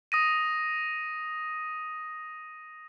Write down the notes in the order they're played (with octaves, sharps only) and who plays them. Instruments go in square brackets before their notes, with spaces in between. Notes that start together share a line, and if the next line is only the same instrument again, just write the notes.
[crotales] D#6 A#6 D#7